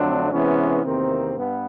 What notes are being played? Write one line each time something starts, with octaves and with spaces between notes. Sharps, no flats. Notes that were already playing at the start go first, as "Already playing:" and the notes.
Already playing: F2 D3 F#3 A3 C4 D4
C3 E3 G#3 B3 C#4
E2 C3 D#3 A#3 C4
G2 B3